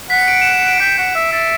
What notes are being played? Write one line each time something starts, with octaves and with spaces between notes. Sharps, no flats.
F#5 B6
C#7
D7
E7
E7
D7
G5 B6
F#5
E5
E5 A6